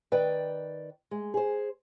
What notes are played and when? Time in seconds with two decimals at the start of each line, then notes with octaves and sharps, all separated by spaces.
0.12 D#3 B4 D5 G5
1.11 G#3
1.34 G#4 C5